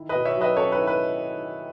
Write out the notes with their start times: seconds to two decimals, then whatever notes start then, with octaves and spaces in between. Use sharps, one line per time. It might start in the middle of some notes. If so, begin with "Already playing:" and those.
Already playing: D#3 E4
0.09 B4 D#5
0.15 B2
0.25 C#5 E5
0.36 F#3
0.41 B4 D#5
0.57 C#4 A4 C#5
0.72 B4
0.77 E4
0.87 B4